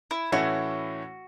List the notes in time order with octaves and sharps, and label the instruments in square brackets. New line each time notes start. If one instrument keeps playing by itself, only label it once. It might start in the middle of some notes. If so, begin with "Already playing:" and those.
[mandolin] E4
[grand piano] A2 E3 A3 C#4 E4 [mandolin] F#4